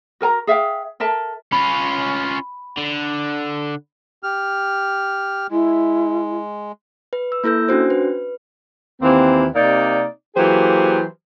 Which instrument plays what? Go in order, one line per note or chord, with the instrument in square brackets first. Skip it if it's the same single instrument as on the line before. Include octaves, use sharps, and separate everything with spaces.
[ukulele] F#4 A#4 G#5 A#5
G#4 E5 F5 G5
A4 A#4 E5 A5
[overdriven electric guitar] C#4 F4 [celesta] B5
[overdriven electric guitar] D3
[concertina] G4 F6
[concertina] G#3 [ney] E4
[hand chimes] B4
E6
A#3 E4 A4 E6 G6
C#4 D4 F#4 C5
B4
[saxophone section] D#2 E3 A#3 C4
C3 A#3 D#4 D5
E3 F#3 A#3 G4 G#4 C5